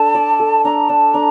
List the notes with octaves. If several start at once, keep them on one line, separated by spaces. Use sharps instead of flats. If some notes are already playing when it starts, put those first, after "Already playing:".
Already playing: D4 A4 A5
D5
A4
D4 A#5
D4 A5
D4 A#5